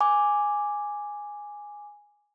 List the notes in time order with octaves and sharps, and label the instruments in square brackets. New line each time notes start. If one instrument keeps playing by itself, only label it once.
[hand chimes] G#5 D6